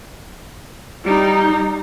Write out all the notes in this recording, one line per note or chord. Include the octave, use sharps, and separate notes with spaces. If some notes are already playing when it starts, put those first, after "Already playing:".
G3 D#4